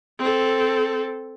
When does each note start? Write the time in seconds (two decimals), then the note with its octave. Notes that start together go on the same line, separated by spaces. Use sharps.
0.19 C4 A4